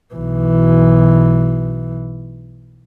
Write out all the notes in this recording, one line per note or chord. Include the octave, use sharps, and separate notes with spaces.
B1 E3